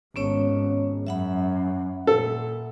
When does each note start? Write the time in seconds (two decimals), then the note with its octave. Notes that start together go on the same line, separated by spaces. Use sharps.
0.16 G#1 B3 C#4 C#5
1.07 F#2 E5 F#5 B5
2.07 A#2 A4